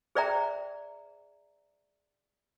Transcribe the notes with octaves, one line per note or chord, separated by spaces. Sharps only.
G#4 C5 D5 E5 G5 A#5